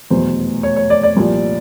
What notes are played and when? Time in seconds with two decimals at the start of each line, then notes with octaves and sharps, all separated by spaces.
0.10 F1 E2 B2 F#3 C5
0.63 C#5
0.76 C#5
0.90 D5
1.03 D5
1.17 C2 A#2 F3